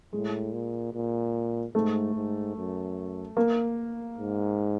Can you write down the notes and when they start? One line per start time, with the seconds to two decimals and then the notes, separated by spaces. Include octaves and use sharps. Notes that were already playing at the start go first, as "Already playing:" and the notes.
0.13 A2 G#3
0.53 A#2
0.93 A#2
1.75 G#2 A3
2.15 G#2
2.56 F#2
3.37 A#3
4.18 G#2